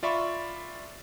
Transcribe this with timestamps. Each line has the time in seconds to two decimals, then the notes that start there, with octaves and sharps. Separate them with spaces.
0.03 F4 D5 E5 B5 C#6